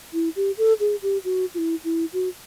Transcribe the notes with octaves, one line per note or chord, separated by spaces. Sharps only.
E4
G4
A4
G#4
G4
F#4
F4
E4
E4
F#4